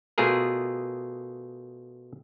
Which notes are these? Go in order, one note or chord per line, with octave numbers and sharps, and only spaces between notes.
B2 A3 F4 G#4 A#4